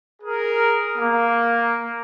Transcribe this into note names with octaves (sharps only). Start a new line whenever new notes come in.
G#4 A#4
A#3